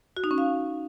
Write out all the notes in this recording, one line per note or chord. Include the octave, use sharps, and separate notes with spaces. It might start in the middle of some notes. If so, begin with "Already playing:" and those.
F#4
D#4
C#4
F5